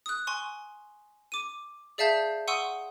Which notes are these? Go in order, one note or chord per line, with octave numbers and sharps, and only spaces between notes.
D#6 F#6
G#5 C6 C#6
D6 D#7
G#4 D5 E5 F5 A5 G6
F#5 C6 C#6 D#6 E6 D#7